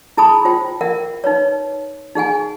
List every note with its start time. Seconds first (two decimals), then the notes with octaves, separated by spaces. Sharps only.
0.17 E4 G#4 A5 B5 D#6
0.45 F4 C5 G5
0.81 A#4 E5 F#5 G5
1.24 D#4 B4 C#5
2.15 D#4 G#4 F#5 G#5